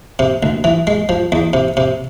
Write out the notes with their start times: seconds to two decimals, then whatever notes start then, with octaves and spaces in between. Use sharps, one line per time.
0.19 C3
0.43 D2
0.64 E3
0.87 G#3
1.09 F3
1.32 E2
1.53 C3
1.77 C3